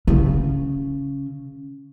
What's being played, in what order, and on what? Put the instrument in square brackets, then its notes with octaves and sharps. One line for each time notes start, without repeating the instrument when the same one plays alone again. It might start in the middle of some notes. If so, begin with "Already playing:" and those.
[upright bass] C#3